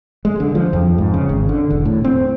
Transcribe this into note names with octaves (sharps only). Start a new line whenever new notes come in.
G#3
D3
F3
F2
G#2
C#3
G#1
D3
E1
A2
C4